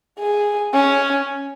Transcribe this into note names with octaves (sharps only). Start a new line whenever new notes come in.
G#4
C#4